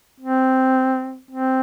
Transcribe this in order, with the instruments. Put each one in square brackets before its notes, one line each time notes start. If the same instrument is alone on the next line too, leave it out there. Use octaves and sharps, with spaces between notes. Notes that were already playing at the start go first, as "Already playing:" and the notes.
[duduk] C4
C4